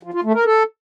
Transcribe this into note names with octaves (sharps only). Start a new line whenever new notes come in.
F3
F4
A3
A#4
A4